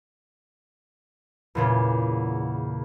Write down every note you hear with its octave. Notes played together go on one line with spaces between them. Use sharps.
E2 A#2 C#3